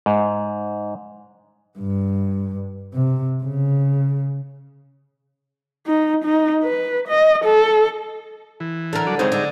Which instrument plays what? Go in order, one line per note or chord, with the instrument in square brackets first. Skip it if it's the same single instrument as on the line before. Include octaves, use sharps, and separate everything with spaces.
[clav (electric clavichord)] G#2
[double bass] G2
C3
C#3
[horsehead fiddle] D#4
D#4
B4
D#5
A4
[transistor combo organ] E3
[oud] D3 A#4
[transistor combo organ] F#3 D5
[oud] D#2 C#3 C4 [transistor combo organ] G#3 D#4
[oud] D3